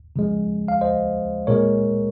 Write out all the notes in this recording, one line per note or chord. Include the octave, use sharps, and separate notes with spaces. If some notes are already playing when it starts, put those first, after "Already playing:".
C#3 F3 G#3
F5
C5 D#5
A#2 G#3 A#4 C#5